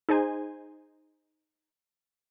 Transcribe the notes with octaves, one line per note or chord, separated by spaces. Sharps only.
D#4 G#4 C5 G#5